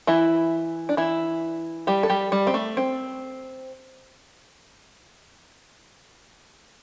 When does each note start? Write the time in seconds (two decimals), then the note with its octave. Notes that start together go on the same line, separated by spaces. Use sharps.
0.07 E3 E4
0.89 D4
0.97 E3 E4
1.87 G3 G4
2.03 A4
2.09 G3 G4
2.32 G3
2.47 C4
2.54 A3
2.77 C4